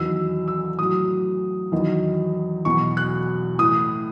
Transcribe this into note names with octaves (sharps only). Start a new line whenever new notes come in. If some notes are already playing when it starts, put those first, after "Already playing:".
Already playing: E2 D#3 F#3 E6
E6
A2 F#3 D#6
E2 D#3 F#3
E2 B2 F#3 C#6
F#6
A2 E3 D#6